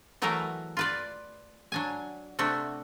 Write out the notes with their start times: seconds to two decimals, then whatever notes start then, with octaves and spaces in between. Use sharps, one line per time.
0.22 E3 F#3 A3 G#4 A#4 B4
0.77 F4 B4 D5
1.72 F#3 D4 G#5
2.39 C3 A3 D4 F#4